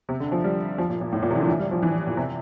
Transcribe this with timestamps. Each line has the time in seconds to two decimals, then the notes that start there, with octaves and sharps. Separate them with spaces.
0.09 C3
0.20 D3
0.32 F3
0.44 G3
0.78 F3
0.90 A#2
1.01 A#2
1.13 A2
1.22 A#2
1.31 C3
1.35 E3
1.40 D3
1.47 E3
1.59 G3
1.71 F3
1.83 E3
2.07 A#2
2.17 C3